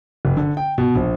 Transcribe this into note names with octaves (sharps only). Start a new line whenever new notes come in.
F#1
D3
G5
B2
A#1